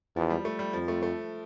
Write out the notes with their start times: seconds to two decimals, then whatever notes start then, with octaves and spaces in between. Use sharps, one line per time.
0.16 E2 F3
0.30 G3
0.45 A3
0.59 G3
0.73 F2 F3
0.88 A3
1.03 A3